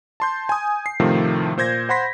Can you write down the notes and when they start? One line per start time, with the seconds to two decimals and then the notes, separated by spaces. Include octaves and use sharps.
0.20 A5 C6 G6
0.49 G#5 D#6
0.86 C7
1.00 A2 C3 D#3 F3 A3
1.57 A#2 C5 G6 G#6 A#6
1.89 C5 F#5 B5 C6 A#6 B6